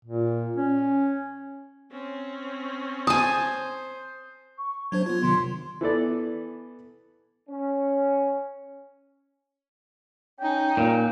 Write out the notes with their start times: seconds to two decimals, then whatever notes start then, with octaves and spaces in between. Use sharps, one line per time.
0.05 A#2
0.56 C#4
1.92 C4 C#4
3.07 C5 G#5 A5 D#6
4.58 C#6
4.92 F#3 D4 C5 G#6
5.06 B3 F4
5.23 C3 D#3 F#3 C6
5.81 E3 B3 A4 D5
7.50 C#4
10.40 C#4 D#4 G5
10.77 A#2